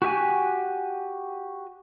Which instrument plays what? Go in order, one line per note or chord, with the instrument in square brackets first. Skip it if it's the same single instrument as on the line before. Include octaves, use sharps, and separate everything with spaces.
[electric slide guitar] F#4 G4 E5 G#5